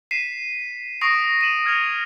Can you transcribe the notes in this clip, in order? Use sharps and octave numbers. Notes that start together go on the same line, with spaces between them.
B6 C7 D#7 E7
C#6 D#6 A#6 C7 D7
D#7 E7 F#7
F6 G#6 C#7 F7